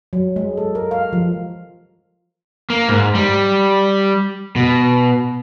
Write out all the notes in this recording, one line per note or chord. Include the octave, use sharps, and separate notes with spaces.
F#3
G#3
A4
A#4
F5
F3
A#3
G#2
G3
B2